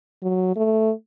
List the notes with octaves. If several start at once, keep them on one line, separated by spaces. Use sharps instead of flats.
F#3
A3